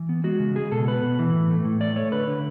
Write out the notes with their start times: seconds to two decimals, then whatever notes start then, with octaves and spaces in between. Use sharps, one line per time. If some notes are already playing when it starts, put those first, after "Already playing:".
Already playing: E3
0.09 B3
0.24 G#3 F#4
0.39 C#3
0.55 G#3 G#4
0.71 B2 A4
0.87 B3 B4
1.03 B2
1.19 E3
1.34 A2
1.50 A3
1.65 A2
1.80 A3 D5
1.96 A3 C#5
2.12 D3 B4
2.27 D3